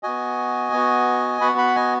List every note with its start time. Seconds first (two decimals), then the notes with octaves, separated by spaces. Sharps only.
0.03 B3 F#4 D#5 G#5
0.73 B3 F#4
1.41 B3 F#4 F#5 B5
1.58 F#5 B5
1.75 D#5 G#5